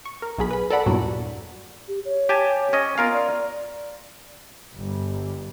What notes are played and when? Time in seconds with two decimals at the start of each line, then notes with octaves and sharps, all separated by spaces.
0.05 C#6
0.22 A#4
0.38 B1 F#3 G#4 B5
0.51 B4 B5
0.70 A4 A#4 D5 F#5 B5
0.86 E2 G2 A#2 F#3
1.88 G4
2.05 C#5
2.29 G4 G#5 A5
2.73 C#4 D#5
2.98 B3 F4 A#4 F5
3.13 D5
4.75 G1 G3